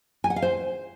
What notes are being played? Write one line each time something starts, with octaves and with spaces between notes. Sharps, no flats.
G#5
F#5
F5
C5